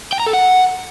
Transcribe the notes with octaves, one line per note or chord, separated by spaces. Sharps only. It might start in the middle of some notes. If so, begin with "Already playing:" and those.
G5
A#5
A4
F#5